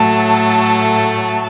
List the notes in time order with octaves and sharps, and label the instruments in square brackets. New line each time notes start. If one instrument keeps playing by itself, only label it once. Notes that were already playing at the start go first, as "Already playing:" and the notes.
Already playing: [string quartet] A2 F#3 A3 A5
A5